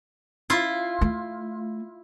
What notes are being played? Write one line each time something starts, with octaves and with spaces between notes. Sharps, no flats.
E4 F4
A3